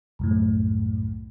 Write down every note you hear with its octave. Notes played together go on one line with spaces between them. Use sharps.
C2 F#2 A2